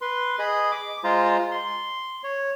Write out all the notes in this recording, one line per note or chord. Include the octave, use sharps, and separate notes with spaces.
B4 C6
G#4 D#5 B5
D6
G#3 F4 C5 A#5
C6
C#5